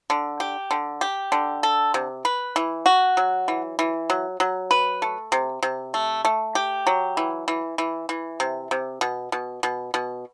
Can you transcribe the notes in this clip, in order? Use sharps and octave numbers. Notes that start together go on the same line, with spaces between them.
D3
G4
D3
G4
D3
A4
C3
B4
E3
F#4
F#3
E3
E3
F#3
F#3
B4
A3
C3
C3
A3
A3
G4
F#3
E3
E3
E3
E3
C3
C3
B2
B2
B2
B2